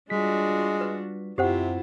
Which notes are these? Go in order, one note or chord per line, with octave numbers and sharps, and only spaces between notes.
G3 G#3 D4 F4 F#4 B6
B4
F#2 C3 C4 E4 F4 G4 C5 F#5